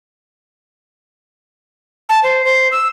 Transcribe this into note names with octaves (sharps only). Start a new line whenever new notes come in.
A5
C5
C5
E6